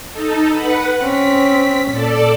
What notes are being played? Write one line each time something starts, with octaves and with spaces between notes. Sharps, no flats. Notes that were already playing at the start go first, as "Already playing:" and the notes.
D#4 A4
B4 F#5
C4 C#4 B6
A#2 A4 D5